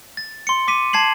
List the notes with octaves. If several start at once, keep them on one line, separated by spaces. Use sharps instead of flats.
A6
C6 C#7
D6 B6 D#7
A5 G#6 C7 F#7